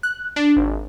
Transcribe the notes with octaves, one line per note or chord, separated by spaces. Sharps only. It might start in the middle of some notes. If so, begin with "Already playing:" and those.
F#6
D4
G#1